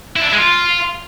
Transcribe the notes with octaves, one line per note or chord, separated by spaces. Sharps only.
E4
D4
E4
G#3
F4